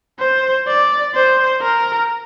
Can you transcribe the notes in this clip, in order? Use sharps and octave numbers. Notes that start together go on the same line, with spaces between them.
C5
D5
C5
A#4